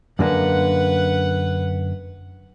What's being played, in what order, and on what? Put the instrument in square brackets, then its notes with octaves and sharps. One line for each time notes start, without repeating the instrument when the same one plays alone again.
[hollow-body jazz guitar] F#2 D3 A#3 [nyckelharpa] B4 F#5